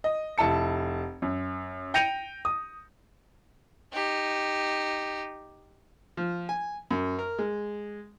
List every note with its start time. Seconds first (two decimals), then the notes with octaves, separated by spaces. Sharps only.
0.04 D#5
0.38 F1 E4 A5 C#7
1.22 F#2
1.94 G5 G6 A#6 C#7 D#7 F7
2.45 D#6
3.93 D#4 G4
6.17 F3
6.49 G#5
6.91 F#2
7.19 A#4
7.39 G#3